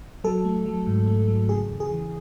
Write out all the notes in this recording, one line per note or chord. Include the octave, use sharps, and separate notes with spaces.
F#3 A4
A3
F#3
G#2
A3
F#3
C#3 G#4
E2
G#4
E3